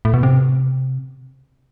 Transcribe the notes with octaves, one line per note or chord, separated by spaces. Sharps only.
A2
B2
C3